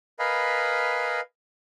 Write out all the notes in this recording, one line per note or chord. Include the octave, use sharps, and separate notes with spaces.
A#4 B4 D#5 F5 G#5 B5